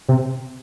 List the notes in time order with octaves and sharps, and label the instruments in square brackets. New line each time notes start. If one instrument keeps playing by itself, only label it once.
[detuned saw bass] C3